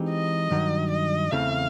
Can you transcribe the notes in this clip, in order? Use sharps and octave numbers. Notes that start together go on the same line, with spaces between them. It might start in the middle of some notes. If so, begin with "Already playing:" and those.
Already playing: E3 G#3 C4 D#4 G4
D#5
G2 D#3 F#3
D#5
E2 C#3 E3 A3 C4 F5